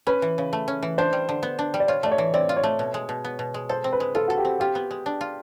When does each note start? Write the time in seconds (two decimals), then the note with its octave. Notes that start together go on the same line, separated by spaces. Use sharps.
0.07 C#4 B4
0.22 E3
0.38 C#3
0.53 A3
0.68 C#4
0.83 E3
0.98 D4 C5
1.13 G3
1.29 D3
1.43 B3
1.59 D4
1.74 G3
1.80 D5
1.88 F4 C#5
2.03 A3 D5
2.11 C#5
2.18 E3
2.34 C4 D5
2.49 F4
2.57 C#5
2.63 A3
2.79 B2
2.94 G#3
3.09 B2
3.25 B3
3.39 B2
3.54 G#3
3.69 A4 C5
3.84 C4
3.93 B4
4.00 G#3
4.15 F4 A4
4.28 F#4 A4
4.38 G4
4.45 C4
4.60 F4 G4
4.75 B3
4.91 G#3
5.06 D4
5.21 F4